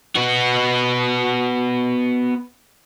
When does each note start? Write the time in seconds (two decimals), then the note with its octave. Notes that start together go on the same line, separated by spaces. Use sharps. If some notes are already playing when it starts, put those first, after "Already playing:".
0.15 B3 F#4